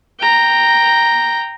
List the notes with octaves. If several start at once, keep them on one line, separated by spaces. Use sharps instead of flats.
G5 A#5